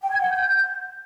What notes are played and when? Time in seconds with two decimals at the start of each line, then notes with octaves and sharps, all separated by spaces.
0.02 G5
0.12 G#6
0.21 F#5
0.31 G6